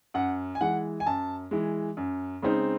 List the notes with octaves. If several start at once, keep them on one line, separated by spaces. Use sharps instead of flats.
F#2 F#5
G#5
E3 G#3 F#5
G#5
F#2 A5
E3 G#3
F#2
C#3 G#3 C4 D#4